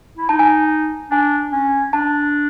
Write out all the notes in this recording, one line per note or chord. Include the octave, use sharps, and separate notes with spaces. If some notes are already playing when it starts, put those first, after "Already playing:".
E4
D#4 A5
G#5
A5
D4 G#5
C#4
D4 A5